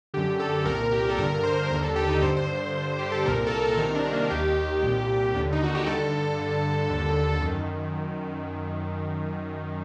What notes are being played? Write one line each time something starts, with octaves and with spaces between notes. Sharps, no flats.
F#2 D3 G4
A4
C2 A#2 A#4
G4
A4
G2 D3 A#4
C5
D#2 D3 A#4
A4
G4
D#4
G2 D3 C5
C5
G2 D3
G4
A4
C2 A#2 A#4
A4
A#4
C2 C3 D#3 A#4
D4
A#3
D#2 D#3 G4
C2 A#2
D#2 D3
D#4
F#4
G4
G2 D3 A4
G2 D3
D#2 D3
F#2 D#3